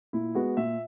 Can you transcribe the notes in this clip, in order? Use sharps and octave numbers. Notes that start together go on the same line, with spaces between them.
A#2 E4
G#3 B3 F#4
A#2 E5